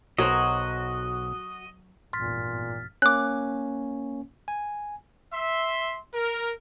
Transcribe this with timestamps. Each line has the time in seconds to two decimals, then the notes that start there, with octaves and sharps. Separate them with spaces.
0.18 B1 F#3 F#4 A#4 C5 C#5 D#5
2.13 G#1 E2 G2 A#2 C6 F6 A6 B6
3.02 A#3 C#4 D6 F#6
4.48 G#5
5.33 E5 C6
6.14 A#4